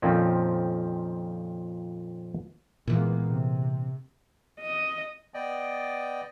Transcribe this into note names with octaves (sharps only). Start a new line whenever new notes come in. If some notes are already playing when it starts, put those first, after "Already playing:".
F2 A#2 D#3 F3 C4 C#4
A#2 E3 G#3 A#3 B3
C3
D#5
B3 D5 D#5 G5